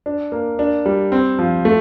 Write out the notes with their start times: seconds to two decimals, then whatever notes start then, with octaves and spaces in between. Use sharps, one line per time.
0.06 D4
0.32 A#3
0.59 D4
0.86 G3
1.12 C4
1.39 F3
1.65 A3